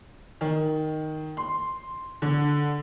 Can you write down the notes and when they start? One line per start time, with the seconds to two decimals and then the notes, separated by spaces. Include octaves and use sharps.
0.41 D#3
1.37 C6
2.22 D3